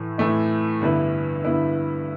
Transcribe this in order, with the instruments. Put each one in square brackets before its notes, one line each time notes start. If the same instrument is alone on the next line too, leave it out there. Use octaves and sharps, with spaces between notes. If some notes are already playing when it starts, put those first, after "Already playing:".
Already playing: [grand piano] A2 E3 A3 E4
A2 E3 A3 E4
G2 D3 B3 E4 B4
G2 D3 B3 E4 B4